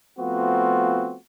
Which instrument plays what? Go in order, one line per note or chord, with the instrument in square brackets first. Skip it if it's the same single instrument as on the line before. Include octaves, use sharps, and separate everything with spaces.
[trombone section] F3 A3 B3 C4 F4 F#4